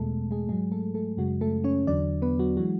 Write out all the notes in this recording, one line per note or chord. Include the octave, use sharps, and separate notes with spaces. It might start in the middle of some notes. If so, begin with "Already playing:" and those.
Already playing: E2 B2 G#3 A3 A4
G#3 G#4
G#2 F#3 G#3 G#4
A3 A4
A3 A4
F#2 C#3 F#3 G#3 F#4
A3 A4
C#4 C#5
E2 D3 F#3 D4 D5
B3 B4
F#3 F#4
E3 F#3 G#3 F#4